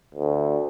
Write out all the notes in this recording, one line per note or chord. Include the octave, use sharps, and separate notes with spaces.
D2